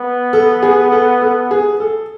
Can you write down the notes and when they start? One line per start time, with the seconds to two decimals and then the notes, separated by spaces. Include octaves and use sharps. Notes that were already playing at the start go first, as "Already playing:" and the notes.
Already playing: B3
0.33 A4
0.63 G#4
0.92 A4
1.21 A4
1.51 G#4
1.80 A4